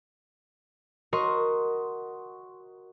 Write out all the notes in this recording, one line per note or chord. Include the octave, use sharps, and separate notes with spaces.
F#4 A#4 D#5 C6 C#6